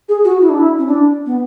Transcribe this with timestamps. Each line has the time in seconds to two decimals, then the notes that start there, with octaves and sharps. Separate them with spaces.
0.09 G#4
0.24 F#4
0.40 E4
0.49 D4
0.59 E4
0.78 C#4
0.87 D4
1.26 B3